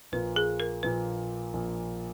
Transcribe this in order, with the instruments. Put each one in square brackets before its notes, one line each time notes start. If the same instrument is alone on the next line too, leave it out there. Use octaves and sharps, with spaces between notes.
[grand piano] A#1 A#2 A#3 [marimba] B4
[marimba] G#4
A#4
[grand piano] A#1 A#2 A#3 [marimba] B4
[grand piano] A#1 A#2 A#3